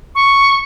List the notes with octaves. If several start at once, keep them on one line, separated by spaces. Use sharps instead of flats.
C#6